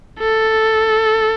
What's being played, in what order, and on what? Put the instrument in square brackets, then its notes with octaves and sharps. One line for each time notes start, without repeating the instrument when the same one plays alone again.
[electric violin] A4